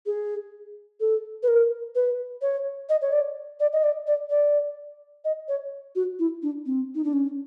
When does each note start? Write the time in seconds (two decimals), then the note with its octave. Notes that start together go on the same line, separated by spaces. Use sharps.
0.06 G#4
1.00 A4
1.43 B4
1.48 A#4
1.95 B4
2.42 C#5
2.89 D#5
3.02 C#5
3.12 D5
3.60 D5
3.73 D#5
3.83 D5
4.07 D5
4.30 D5
5.24 D#5
5.48 C#5
5.95 F#4
6.19 E4
6.42 D4
6.66 C4
6.95 D#4
7.04 D4
7.13 C#4